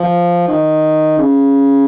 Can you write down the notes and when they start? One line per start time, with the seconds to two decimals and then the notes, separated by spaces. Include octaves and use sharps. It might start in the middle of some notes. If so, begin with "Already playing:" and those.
Already playing: F3
0.48 D#3
1.18 C#3